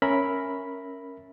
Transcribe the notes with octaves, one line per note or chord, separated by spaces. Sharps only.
C#4 A#4 E5 B5